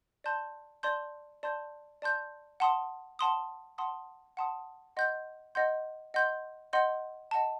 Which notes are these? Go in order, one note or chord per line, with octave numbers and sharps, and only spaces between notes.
D5 A5 C6 G6
D5 A5 C6 G6
D5 A5 C6 G6
D5 A5 C6 G6
F#5 A5 C6 D#6
F#5 A5 C6 D#6
F#5 A5 C6 D#6
F#5 A5 C6 D#6
D#5 F#5 C6 G6
D#5 F#5 C6 G6
D#5 F#5 C6 G6
D#5 F#5 C6 G6
D#5 F#5 A5